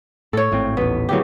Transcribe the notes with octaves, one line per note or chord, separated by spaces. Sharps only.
A2 A4 C#5
G#1 A2 C4
D#1 A1 B3
D1 D2 C#3 E3 F#3 G4